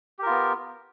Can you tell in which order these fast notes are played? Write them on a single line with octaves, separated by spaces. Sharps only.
G4 A#4 F4 B3